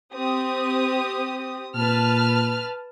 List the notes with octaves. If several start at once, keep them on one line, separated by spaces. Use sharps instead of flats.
C4 G4 D#6
A#2 B4 A5 F6